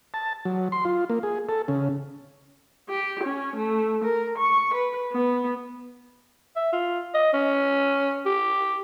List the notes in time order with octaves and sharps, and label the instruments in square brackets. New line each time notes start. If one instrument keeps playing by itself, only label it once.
[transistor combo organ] A5
F#3
C6
F4
A#3
G#4
A4
C#3
[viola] G4
C#4
A3
A#4
C#6
B4
B3
[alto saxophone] E5
F4
D#5
C#4
G4